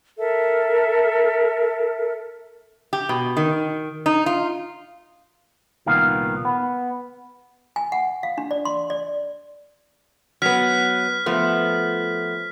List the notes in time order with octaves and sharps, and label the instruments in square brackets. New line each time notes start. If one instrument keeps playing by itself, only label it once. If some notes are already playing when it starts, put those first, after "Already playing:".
[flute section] A4 A#4 E5
[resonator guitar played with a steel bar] G4
B2
D#3
D#4
F4
[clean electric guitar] C2 A#2 D#3 B3 F5
B3
[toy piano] G#5
F#5
F5
D4
D5
C6
D5
[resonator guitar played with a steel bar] F#3 B3 [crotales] F6 B6
[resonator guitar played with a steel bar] F3 A3 B3